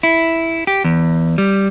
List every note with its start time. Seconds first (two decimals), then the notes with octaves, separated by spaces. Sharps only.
0.03 E4
0.67 G4
0.84 E2
1.38 G3